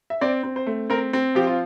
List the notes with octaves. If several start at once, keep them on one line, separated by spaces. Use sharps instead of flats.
E5
C4 D5
C4
C5
A3
C4 A#4
C4
F3 G4
F4